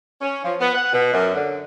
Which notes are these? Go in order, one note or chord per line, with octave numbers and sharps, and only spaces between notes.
C#4
F3
B3
F#5
B2
F#2
D3